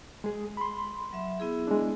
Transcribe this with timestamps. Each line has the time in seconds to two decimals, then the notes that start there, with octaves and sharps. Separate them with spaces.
0.24 G#3 G#4
0.57 B5 C6
1.13 F#3 E5
1.40 B3 E4 G#4
1.67 G#3 D4